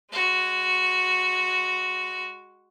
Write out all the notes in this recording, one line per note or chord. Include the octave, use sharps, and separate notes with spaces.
G#3 F#4